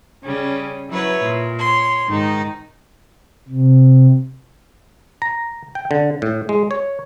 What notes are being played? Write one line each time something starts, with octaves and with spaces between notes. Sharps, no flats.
C#3 G3 C#4
F#3 E4 B4 C#5
A#2
C#5 C6
G#2 D#3 D#4
C3
A#5
G5
D3
A2
G#3
C#5